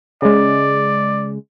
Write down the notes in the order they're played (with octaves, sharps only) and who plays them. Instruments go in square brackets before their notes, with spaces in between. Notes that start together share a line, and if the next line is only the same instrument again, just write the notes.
[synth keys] C#3 G#3 [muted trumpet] D5